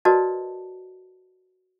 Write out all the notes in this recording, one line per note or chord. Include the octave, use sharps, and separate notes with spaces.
F#4 A#4 B4 D5 D#5 A5